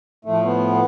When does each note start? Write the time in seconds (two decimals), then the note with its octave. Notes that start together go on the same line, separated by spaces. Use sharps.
0.25 A2 F3 A3
0.45 B3